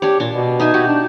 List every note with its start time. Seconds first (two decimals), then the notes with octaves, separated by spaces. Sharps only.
0.02 D4 G4 C#5
0.20 A#2 D4
0.34 B2
0.60 D#4 E5 G#5
0.74 F#4 G4
0.87 D4